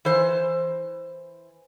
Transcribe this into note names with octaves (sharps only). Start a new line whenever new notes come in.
E3 C5